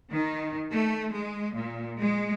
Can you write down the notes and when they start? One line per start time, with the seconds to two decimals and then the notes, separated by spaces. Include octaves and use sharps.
0.12 D#3
0.72 A3
1.14 G#3
1.55 A#2
1.99 G#3